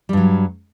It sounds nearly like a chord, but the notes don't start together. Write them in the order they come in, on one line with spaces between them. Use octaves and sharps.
G3 G2 F#3